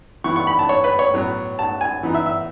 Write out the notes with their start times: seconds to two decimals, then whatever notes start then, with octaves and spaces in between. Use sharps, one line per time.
0.24 E3 B3 E4 C#6
0.36 C#6
0.47 B5
0.59 A5
0.69 C#5
0.84 B4
0.99 C#5
1.14 A2 F#3 B3
1.59 A5
1.81 G#5
2.03 E3 B3 D#4
2.14 E5
2.26 E5